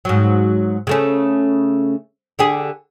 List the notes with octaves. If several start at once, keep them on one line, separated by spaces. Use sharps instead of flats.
G#2 F#3
C#3 A3 C#4
D3 G4 G#4